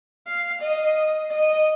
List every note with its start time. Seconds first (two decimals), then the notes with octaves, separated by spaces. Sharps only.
0.27 F5
0.61 D#5
1.31 D#5